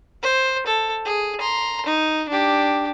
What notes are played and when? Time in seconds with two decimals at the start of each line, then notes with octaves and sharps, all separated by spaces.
0.22 C5
0.66 A4
1.06 G#4
1.40 A#5 C6
1.86 D#4
2.29 D4 G4